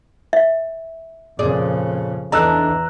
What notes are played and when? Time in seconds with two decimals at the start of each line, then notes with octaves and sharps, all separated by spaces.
0.33 E5
1.39 F2 A#2 C#3 G#4 D5
2.32 E2 E3 D4 D#4 A4 A#5 E6 F#6